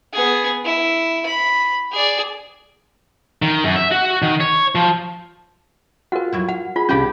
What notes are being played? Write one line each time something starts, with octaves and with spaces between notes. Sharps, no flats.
B3 G#4
E4
B5
G#4 D5
D#3
F#2
E5
F#4
D#3
C#5
F3
F4 F#4 A#4 F#5
F2 F#3 E4
F5 F#5
F4 G#4 B5
C2 C#4 D4 G4 G#4 F5 B5 G6